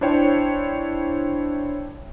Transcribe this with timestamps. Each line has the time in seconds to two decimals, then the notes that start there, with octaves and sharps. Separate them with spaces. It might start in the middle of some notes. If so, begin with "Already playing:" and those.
0.01 D4 E4 C5 C#5 G5